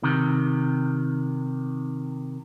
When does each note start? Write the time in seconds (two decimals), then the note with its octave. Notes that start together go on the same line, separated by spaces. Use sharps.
0.03 C3 D#3